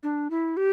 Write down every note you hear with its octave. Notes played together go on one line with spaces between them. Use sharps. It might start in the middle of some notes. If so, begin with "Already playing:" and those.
D4
E4
G4